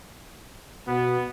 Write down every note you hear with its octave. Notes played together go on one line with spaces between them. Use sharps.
B2 B3